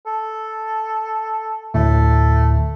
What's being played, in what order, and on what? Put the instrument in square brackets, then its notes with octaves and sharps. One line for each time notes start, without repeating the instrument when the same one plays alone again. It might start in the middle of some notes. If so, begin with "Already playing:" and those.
[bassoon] A4
[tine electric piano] D2 A2 [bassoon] A3